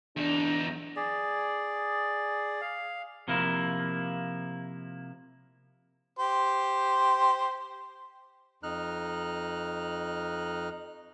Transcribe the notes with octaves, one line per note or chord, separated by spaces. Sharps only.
E2 D4 D#4
G#4 D5
F5
C3 F3 A#3 E4
G4 C5
F2 D#4 F6 F#6